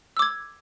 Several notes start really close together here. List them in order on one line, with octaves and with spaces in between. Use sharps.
E6 D6 G#6